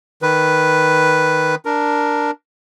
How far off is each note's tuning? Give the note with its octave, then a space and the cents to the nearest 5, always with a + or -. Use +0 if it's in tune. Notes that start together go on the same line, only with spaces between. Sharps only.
D#3 +0 B4 +0
D4 +0 A#4 +0